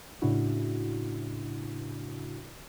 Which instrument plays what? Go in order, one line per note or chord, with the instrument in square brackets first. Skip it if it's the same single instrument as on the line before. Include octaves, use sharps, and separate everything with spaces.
[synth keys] A2 C#3 D4 E4 F#4